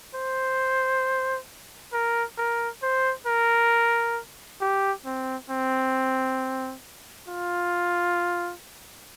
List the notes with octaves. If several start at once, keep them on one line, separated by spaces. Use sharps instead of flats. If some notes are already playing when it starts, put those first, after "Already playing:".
C5
A#4
A#4
C5
A#4
G4
C4
C4
F4